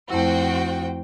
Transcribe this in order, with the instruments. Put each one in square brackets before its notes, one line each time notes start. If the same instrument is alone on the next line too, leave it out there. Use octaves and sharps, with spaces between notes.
[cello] F2 [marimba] A3 E4 [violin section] F#4 C5 G5